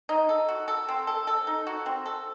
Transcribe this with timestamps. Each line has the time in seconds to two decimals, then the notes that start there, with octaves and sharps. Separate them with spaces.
0.09 D#4
0.29 A4
0.49 F#4
0.68 A4
0.88 C4
1.07 A4
1.27 A4
1.47 D#4
1.67 F#4
1.86 C4
2.06 A4